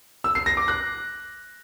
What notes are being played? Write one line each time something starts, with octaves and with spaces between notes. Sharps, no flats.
E6
C7
A#6
D6
F#6